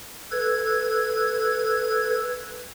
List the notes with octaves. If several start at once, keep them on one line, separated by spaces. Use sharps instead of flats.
A4 B4 G#6